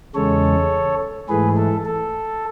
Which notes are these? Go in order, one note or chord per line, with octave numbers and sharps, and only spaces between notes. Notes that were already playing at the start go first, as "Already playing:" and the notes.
E2 C#3 G#3 A4 C#5
G#2 E3 A3 G#4 B4
A4
A4